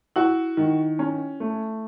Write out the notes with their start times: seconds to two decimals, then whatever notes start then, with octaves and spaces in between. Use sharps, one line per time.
0.16 E4 F#4
0.57 D#3
0.99 C#4
1.40 A3